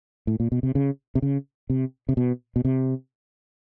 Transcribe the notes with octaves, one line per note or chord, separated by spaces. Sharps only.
A2
A#2
B2
C3
C#3
C3
C#3
C3
C3
B2
B2
C3